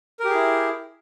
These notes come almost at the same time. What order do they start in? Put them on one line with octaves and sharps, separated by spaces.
A#4 G4 G#4 E4